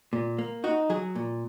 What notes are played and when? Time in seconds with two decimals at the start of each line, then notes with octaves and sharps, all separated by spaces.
0.13 A#2
0.38 A#3
0.64 D#4 F#4
0.90 F#3 G#4
1.15 A#2